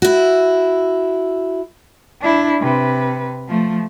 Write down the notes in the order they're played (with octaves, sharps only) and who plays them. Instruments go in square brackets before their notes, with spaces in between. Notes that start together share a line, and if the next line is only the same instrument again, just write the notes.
[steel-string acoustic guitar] E4 F#4
[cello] D4 E4
C3 B4
F3 A3